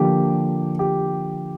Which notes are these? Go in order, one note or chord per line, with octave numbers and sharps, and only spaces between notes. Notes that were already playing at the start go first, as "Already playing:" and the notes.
Already playing: D3 F3 A#3 G4
G4